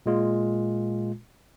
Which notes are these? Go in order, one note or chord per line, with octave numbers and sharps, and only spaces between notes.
A#2 G#3 F4